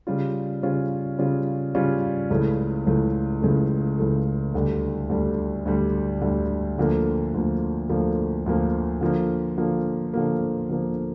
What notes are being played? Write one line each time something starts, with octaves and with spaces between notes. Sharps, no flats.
C#3 G3 C#4 F4
C#3 G3 C#4 F4
C#3 G3 C#4 F4
C#3 G3 C#4 F4
C#2 C#3 E3 A3
C#2 C#3 E3 A3
C#2 C#3 E3 A3
C#2 C#3 E3 A3
D2 D3 G3
D2 D3 G3
D2 D3 G3
D2 D3 G3
D2 D3 F3 A#3
D2 D3 F3 A#3
D2 D3 F3 A#3
D2 D3 F3 A#3
D3 F3 A#3
D3 F3 A#3
D3 F3 A#3
D3 F3 A#3